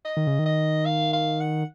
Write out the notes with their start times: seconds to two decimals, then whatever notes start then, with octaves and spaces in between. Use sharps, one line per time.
0.05 D#5
0.17 D#3
0.27 C#3
0.39 D#3
0.45 D#5
0.86 F5
1.13 F5
1.40 F#5